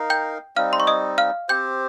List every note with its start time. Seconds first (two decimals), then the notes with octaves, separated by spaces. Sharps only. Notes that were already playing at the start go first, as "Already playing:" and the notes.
Already playing: D#4 A#4 F5
0.10 G5 G6
0.56 G3 C4 D#4 F5 F6
0.73 C6
0.80 C#6
0.87 D#5 D#6
1.18 F5 F6
1.49 C4 G4 C5 G5 G6